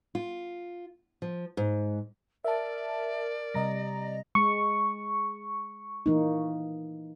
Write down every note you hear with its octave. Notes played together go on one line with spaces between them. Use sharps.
F4
F3
G#2
A#4 D5 E5 A5
C3 G3 D#5 A#5 A#6
G#3 C#6
E3 A#3 D#4